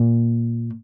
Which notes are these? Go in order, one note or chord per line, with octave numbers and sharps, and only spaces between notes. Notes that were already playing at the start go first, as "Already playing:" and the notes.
Already playing: A#2